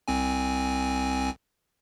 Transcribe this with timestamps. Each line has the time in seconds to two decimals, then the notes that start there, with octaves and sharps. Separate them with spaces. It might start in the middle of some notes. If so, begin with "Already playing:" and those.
0.08 C2 C4 G#5